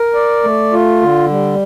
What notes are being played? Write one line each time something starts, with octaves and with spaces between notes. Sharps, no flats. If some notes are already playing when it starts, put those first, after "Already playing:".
Already playing: A#4
D5
A3
F4
D3
G3